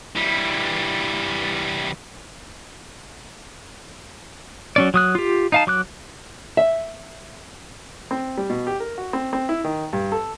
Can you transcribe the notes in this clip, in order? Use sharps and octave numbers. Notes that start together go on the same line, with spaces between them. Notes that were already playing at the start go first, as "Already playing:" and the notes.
E3 G3
F#3 C#4 D5
F#3 D#6 F#6
F4 G4
D#4 F5 A5
F#3 D6 F#6
E5
C4
G3
B2
G4
A#4
F#4
C4
C4
E4
D#3
G2
A4